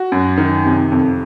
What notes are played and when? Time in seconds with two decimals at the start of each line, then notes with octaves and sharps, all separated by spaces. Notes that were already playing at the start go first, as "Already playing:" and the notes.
Already playing: F#4
0.12 F#2
0.38 D#3
0.65 C3
0.92 F2